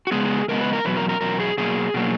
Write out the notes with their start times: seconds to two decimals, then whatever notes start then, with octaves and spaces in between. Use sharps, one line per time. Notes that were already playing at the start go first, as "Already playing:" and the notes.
0.07 F#4
0.11 C#3 G#3 B3 G#4
0.48 C#3 G#3 B3 A#4
0.61 B4
0.73 A#4
0.85 E2 B2 F#3 B4
0.97 A#4
1.09 A#4
1.21 E2 B2 F#3 A#4
1.40 G#4
1.58 B2 F#3 A#3 G#4
1.94 B2 F#3 A#3